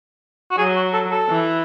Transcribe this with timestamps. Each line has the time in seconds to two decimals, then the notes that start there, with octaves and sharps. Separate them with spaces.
0.51 F#4
0.58 F#3 G#4
0.76 F#4
0.93 A4
1.11 A4
1.29 E3